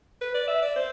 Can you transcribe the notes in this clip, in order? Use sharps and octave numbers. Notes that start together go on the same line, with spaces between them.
B4
D5
E5
D5
C5